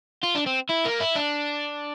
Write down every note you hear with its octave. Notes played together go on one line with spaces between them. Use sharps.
F4
D4
C4
E4
A#3
E4
D4